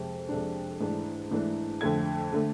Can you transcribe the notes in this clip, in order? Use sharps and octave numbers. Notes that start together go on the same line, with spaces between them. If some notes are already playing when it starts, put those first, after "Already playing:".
Already playing: F2 C3 G#3
F2 C3 G#3 D4
G#2 E3 A3 D4
G#2 E3 A3 D4
F2 D3 A3 G#6
D3 A3